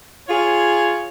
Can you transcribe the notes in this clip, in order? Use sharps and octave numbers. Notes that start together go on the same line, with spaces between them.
F4 G#4 C#5